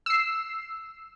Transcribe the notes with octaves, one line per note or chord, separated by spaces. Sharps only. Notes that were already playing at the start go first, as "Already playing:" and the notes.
E6 C7